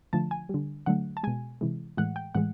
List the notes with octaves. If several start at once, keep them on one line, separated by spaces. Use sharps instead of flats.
D3 F3 A3 A5
G#5
D3 G3
D3 F#3 A3 F#5
A5
B2 G#3 G#5
C3 E3 G#3
A2 E3 G#3 F#5
G5
A2 E3 G#3 F#5